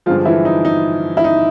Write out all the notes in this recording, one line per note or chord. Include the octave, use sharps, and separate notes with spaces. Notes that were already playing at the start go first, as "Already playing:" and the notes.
G2 D3 F3 G#3 F4
E3 E4
D#4
D#4
E4
D#4